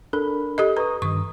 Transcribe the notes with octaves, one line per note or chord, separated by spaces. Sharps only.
D4 A4 A#4 B5
G4 A4 D#5
B4 A#5 C#6 D#6
G2 D#3 C#6 D#6